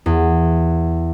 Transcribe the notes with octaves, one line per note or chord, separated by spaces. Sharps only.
E2